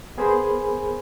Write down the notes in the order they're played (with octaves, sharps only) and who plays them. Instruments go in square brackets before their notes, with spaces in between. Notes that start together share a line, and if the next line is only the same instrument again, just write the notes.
[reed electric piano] B3 G#4 A#4 C5 G#5 B5